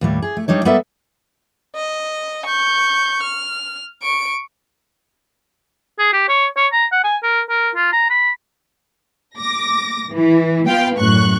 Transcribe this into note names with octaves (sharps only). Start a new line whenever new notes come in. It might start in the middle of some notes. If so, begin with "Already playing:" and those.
D#2 A2 G3
G#4
A3
G3 D4 D#4 C#5
G3 B3 A4 A#4 D5 E5
D#5
C#6 G6
F6
C#6 D7
G#4
G4
C#5
C#5
A#5
F#5
G#5
A#4
A#4
F4
A#5
B5
D6 A#6
E3
B3 F4 B4 F5 G5
F#2 A2 C#6 F#6